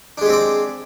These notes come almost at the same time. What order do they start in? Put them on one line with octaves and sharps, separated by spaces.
D4 G#3 G4 C4 D5